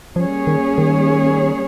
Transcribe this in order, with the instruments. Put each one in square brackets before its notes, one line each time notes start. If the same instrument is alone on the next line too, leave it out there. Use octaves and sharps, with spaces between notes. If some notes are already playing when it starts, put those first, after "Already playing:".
[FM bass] F3 [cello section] G3 A#3 C#4 G#4 C#5
[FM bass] D#3
D#3